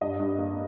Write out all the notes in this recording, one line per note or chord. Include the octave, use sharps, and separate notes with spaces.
G2 D#5
G2
A#3